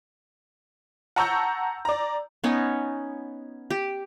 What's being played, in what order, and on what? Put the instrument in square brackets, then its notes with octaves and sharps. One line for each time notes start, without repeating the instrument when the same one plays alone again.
[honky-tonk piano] F#5 A5 A#5 C#6 E6 G6
D5 A#5
[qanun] B3 C#4 D#4
G4